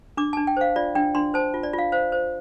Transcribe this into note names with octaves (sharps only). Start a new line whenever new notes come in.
D4 D6
D4 A5
G5
C5 F5
F4 D5
D4 G5
D4 C6
C5 A5
F4
D5
F4
F5
C5 F5
C5